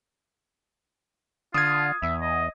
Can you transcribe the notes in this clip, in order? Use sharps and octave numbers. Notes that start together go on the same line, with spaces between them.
D3 F4 D#6 G#6
E2 E5
D#5